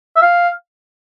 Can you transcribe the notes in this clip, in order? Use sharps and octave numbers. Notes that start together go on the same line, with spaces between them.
E5
F5